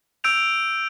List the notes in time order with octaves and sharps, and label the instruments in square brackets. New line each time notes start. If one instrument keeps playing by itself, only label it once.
[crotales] E6 G6 D7 F7